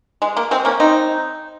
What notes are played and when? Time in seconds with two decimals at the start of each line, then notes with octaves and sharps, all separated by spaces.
0.22 G#3
0.37 A#3
0.51 G#3 C4
0.65 A#3 C#4
0.80 C4 D#4